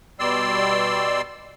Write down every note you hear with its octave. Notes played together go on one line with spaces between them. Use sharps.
B2 G3 D5 C6 E6